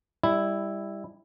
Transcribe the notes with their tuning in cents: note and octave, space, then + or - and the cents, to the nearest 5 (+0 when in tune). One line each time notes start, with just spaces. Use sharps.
G3 +20 E4 +0